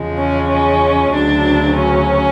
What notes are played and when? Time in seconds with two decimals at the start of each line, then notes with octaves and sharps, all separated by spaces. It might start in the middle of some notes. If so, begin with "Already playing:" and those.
Already playing: E2 C#3 F3 G#3
0.18 C#4
0.49 C#4
1.12 D2 C#3 F#3 D4
1.77 C#4